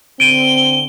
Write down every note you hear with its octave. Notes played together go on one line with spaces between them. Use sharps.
D3 C4 D7 D#7 G7